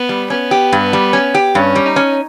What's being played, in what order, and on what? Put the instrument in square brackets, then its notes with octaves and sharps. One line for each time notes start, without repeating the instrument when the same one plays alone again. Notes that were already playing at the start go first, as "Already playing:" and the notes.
Already playing: [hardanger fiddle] B3
[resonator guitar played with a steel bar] G3
[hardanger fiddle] B3 [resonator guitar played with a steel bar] C#4
[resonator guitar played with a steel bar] G4
G2
G3
C#4
G4
[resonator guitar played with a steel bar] G2 [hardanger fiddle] C#4
[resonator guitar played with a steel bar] G3
[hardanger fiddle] D#4
[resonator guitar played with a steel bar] C#4